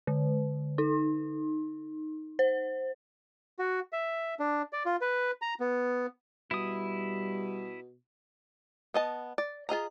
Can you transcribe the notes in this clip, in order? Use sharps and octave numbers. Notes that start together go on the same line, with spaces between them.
D3
D#4
C5
F#4
E5
D4
D5
F4
B4
A#5
B3
B2 G3 E4 D#6
B3 D#5 A5
D5
F4 G#4 D#5 A#5